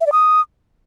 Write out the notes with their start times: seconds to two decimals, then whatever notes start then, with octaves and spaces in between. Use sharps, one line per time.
0.01 E5
0.07 D5
0.12 D#6